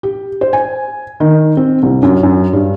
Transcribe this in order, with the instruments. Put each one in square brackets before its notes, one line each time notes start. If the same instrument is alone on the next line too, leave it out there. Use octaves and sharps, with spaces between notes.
[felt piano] G4
C5
G#5
D#3
C4
C2
F#2
F#2
G2